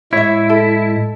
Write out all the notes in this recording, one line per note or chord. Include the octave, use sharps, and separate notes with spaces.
A2 G#3 E4 C#5 E5
A4